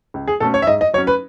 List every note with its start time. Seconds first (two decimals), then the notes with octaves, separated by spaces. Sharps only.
0.14 C#2
0.28 G#4
0.40 B2 A3 C#4 A4
0.54 C#5
0.62 E5
0.67 G#2 D#5
0.81 D#5
0.93 F#3 C#5
0.98 C#4
1.07 B4